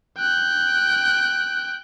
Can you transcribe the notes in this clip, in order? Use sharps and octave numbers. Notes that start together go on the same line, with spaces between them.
G5 F#6